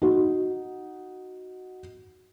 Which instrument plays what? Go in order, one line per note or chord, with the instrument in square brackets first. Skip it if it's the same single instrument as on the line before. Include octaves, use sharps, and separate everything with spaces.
[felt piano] D#4 F#4